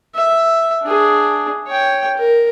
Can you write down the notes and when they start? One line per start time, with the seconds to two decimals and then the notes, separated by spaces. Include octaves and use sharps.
0.15 E5
0.83 D4 G#4
1.68 C#5 G5
2.17 A#4